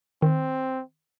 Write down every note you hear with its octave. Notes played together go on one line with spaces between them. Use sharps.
D#3 C4